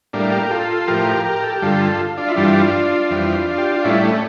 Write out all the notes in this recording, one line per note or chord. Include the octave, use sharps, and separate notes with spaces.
A2 G3 A#3 D4
G4 A#4
F4 A4
A2 F3 G4 A#4
G4 A#4
A4
G4
G2 D3 G3 F4 A4
D4 F4
E4
G2 E3 G3 D4 F4
F2 E3 G3
G4
F4
A2 G3 C#4 E4
A3 C#4